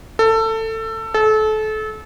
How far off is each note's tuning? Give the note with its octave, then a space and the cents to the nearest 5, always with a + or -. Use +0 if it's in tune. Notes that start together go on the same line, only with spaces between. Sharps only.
A4 +20
A4 -30